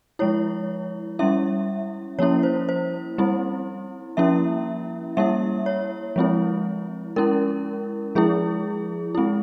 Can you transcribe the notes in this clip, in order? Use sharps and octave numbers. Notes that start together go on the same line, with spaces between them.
F3 G#3 E4 C#5
G3 C#4 E4 E5
F3 A#3 C#4 E4 C#5
C5
C5
G3 C4 E4
F3 A#3 C#4 E4 E5
G3 A#3 E4 E5
C#5
F3 G#3 C4 E4
G#3 C#4 E4 A#4
F3 G#3 E4 G#4
G#3 C4 E4